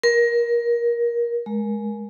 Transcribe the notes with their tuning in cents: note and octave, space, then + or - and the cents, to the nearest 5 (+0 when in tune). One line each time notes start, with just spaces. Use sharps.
A#4 +20
G#3 +20